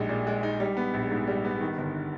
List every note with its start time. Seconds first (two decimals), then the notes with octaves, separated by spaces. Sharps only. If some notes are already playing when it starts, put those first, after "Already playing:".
Already playing: A#1 G3 G#3 D#4
0.09 A#2
0.27 G#3
0.43 D#4
0.60 G3
0.77 B3
0.94 A#1
1.11 G#2
1.27 G3
1.45 B3
1.61 D#3
1.78 G1